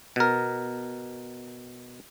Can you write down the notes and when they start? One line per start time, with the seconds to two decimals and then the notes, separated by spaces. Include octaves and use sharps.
0.16 B2 A#4